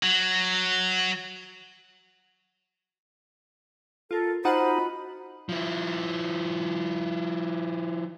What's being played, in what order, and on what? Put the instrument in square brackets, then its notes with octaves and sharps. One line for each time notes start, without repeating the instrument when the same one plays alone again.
[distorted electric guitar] F#3
[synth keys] F4 A#4 [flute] A4
[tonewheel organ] D#4 [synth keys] F4 F#4 F#5 [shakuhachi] C5 [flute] B5
[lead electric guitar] F3 E4